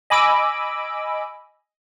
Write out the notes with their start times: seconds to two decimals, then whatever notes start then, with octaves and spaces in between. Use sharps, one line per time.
0.10 D#5 G#5 B5 D6 E6 D7